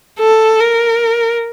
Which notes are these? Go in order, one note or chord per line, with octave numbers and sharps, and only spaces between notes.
A4
A#4